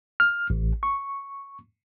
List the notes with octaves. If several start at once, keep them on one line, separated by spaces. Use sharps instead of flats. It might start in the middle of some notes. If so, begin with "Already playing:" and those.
F6
A1
C#6